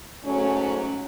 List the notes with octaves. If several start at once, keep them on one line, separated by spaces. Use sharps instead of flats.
G#2 F#3 A3 C#4